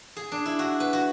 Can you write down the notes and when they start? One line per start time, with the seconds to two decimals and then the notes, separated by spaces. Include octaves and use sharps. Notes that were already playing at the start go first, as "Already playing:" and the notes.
0.17 G#4
0.32 D4
0.46 E4
0.59 F#4
0.80 B4
0.93 F#4